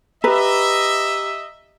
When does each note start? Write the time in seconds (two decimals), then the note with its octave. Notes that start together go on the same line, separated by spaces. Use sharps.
0.24 G4 B4 D#5 E5 A#5